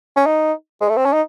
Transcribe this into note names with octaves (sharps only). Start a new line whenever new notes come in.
C#4
D#4
G#3
A3
C4
C#4
D#4